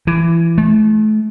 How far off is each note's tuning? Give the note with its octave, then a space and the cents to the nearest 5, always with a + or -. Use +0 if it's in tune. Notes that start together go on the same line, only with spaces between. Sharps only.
E3 +20
A3 -35